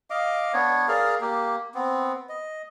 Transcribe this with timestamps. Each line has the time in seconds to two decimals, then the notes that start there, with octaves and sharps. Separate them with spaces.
0.10 D#5 F5 D6
0.53 B3 D4 C#5
0.88 G#4 A#4 D5 F5
1.21 A#3 G4
1.74 B3 C4
2.29 D#5